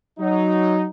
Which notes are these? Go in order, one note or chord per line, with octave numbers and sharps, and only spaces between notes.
F#3 D#4